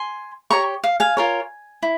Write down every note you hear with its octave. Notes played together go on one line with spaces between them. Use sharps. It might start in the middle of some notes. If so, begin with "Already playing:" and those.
Already playing: G#5 C6
G4 C#5 A#5 C#6
F5
F5 G#5
F4 A#4 C#5
E4